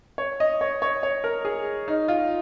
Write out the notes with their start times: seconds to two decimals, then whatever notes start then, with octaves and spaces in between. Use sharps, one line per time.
0.18 C#5
0.40 D#5
0.61 C#5
0.82 C#5
1.03 C#5
1.24 A#4
1.45 G#4
1.88 D#4
2.08 F4